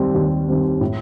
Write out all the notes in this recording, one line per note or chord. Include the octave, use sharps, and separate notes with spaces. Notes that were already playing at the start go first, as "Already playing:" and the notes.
Already playing: D#2 D#3 G3 C4
D#2
D#3 G3 C4
A2